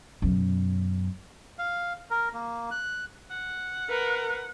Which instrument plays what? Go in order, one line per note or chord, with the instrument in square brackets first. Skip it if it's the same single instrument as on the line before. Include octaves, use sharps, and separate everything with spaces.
[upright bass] F#2 B2
[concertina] F5
A#4
A#3
F#6
[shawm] F#5
[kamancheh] A#4 B4